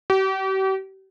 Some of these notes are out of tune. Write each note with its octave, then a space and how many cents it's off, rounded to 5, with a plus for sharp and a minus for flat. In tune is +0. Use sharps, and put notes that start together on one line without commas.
G4 -40